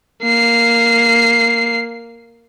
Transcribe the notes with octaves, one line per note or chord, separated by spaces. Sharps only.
A#3 C7